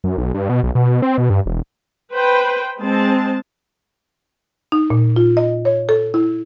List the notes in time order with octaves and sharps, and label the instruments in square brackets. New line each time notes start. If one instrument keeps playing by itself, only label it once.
[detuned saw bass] F#2
B1
G2
B2
B1
B2
B2
C4
B2
G2
E1
[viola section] B4 C5 G5
G#3 C4 A5
[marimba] D#4
A#2
F4
D#5
C#5
A4
E4